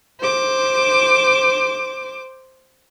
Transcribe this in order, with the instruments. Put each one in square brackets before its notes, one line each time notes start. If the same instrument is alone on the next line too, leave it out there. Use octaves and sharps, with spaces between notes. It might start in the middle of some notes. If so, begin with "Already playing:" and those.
[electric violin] C5 D6